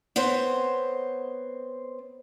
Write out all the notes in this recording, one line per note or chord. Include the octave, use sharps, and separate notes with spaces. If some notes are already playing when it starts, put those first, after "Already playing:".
B3 C4 C5 C#5